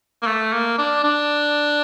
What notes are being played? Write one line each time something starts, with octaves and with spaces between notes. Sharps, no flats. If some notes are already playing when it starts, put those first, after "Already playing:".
A#3
A3
A#3
D4
D4